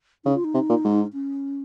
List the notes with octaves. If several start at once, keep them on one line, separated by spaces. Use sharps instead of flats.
C#3 D#4
F4
D#4
C3
A#2
G#2
C#4